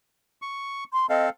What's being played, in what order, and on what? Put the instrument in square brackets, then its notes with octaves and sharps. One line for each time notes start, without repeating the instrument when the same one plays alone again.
[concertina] C#6
[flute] C6
[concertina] C4 A4 F5 [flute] D#5